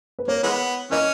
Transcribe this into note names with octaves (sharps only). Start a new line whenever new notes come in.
B4
A#3 C#5
E3 G#3 B3
E3 A#3 C#4 D#5